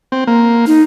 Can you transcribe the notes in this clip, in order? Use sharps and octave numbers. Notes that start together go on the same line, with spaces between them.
C4
A#3
D#4